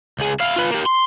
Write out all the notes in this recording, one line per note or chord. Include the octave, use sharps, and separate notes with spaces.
C#2 G#4
E4 F5
F4 B4
A#3 G4
C6